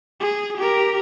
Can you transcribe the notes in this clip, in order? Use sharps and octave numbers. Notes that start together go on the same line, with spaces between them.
G#4
G4 A#4